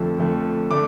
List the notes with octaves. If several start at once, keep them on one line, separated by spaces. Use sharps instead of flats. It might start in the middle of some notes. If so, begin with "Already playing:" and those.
Already playing: F2 D3 F3 A3
F2 D3 F3 A3
D3 A3 D4 D6